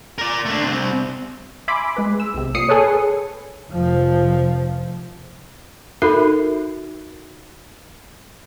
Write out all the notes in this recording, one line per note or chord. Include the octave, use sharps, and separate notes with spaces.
A#4 D5
A3 D4
C2 C4
E5 G#5 B5 C6 D6
G#3 B4
E6
B1 C3
A#2 D#6 C7 C#7
G#4 A4 B4 C#5
F1 F3
D#4 F#4 A4 A#4 E5 B5